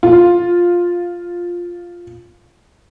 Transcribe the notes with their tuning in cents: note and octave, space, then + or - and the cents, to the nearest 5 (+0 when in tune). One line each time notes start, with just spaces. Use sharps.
F4 +5